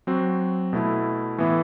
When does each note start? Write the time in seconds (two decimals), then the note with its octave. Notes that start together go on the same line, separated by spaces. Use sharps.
0.07 F#3 C4 F#4
0.73 B2 A3 E4
1.38 A2 E3 B3 E4